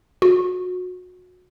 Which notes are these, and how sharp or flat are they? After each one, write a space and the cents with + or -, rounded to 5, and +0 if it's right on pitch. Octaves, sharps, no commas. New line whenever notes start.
F#4 -30